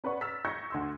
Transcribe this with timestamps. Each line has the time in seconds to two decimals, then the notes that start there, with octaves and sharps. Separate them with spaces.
0.04 C#4 B4 D5 F#5 C#6
0.21 E6 F6 A6 B6
0.45 C#6 E6 G6 G#6 A#6 C#7
0.70 D2 C6 E6